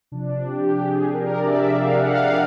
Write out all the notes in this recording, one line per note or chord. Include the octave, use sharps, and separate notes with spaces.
C3 F3 D4
D4
G4
G4
G#4
A#4
D5
E5
F5
F#5
F5